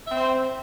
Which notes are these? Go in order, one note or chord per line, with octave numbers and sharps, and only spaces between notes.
C4 C5 E5